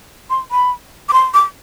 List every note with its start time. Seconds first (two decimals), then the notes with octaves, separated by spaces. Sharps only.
0.30 C6
0.51 B5
1.09 D6
1.13 C6
1.34 D6